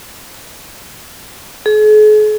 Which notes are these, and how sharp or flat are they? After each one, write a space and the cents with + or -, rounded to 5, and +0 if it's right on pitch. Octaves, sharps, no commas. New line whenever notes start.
G#4 +45